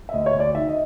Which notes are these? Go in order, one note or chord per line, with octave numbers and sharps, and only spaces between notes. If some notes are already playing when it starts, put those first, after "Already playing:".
E5
D2 D#5
C#5
D2
D5
D#3 E5
D#5